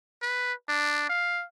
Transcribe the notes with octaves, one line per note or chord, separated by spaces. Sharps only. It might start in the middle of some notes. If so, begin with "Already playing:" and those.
B4
D4
F5